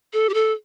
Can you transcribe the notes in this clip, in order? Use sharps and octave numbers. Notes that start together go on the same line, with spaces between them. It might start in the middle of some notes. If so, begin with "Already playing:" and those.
A4
G4
A4